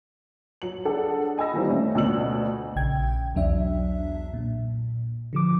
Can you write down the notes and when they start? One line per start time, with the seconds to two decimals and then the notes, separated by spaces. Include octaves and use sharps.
0.62 F#3 F#7
0.85 D4 G#4 A4 F#5
1.38 D#5 G#5 B5 E6 A#6
1.53 A#2 D#3 E3 G3 A#3 C4
1.69 A3 C#4 D4
1.95 D2 B2 E6 F#7
2.76 A#1 C#3 G5 G#6
3.35 B1 E2 F#3 D4 E5
4.34 A#2
5.33 D3 F3 D6